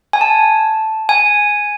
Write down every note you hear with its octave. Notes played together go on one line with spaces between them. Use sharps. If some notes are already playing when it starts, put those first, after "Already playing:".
G#5
A5
G#5